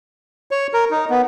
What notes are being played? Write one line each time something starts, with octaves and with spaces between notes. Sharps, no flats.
C#5
A#4
D#4
B3